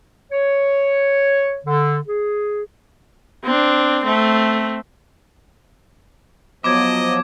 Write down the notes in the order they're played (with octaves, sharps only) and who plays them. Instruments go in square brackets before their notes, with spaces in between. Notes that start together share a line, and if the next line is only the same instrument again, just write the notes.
[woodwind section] C#5
D3
G#4
[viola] C4 D4
A3 C4
[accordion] F3 F#3 [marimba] B3 [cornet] D#5 [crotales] D6 G#6 D7